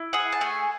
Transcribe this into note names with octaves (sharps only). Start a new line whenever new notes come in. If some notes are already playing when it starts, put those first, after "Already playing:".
Already playing: E4
G#4 F#5
A5
A3 G#5